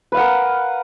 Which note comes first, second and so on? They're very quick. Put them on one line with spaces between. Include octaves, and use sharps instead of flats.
B4 F5 F#5 A#4